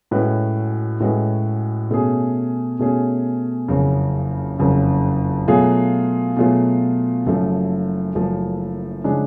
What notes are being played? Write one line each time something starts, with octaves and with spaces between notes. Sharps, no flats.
A2 G#3 C#4 F#4 B4
A2 G#3 C#4 F#4 B4
B2 A3 C#4 G#4
B2 A3 C#4 G#4
F#1 F2 C#3
F#1 F2 C#3
B2 F#3 A3 F4 G#4
B2 F#3 A3 F4 G#4
F#1 F#2 F3 A3
F#1 F#2 F3 A3
C#3 F3 G#3 D4